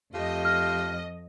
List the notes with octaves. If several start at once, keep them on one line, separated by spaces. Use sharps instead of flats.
F2 A3 F4 G4 D#5
F6